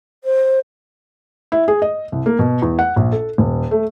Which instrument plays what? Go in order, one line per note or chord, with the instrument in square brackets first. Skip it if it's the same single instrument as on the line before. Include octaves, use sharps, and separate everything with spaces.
[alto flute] C5
[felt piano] E4
G#4
D#5
C2
A#3
B2
E2
F#5
A#1
A4
D#1
A3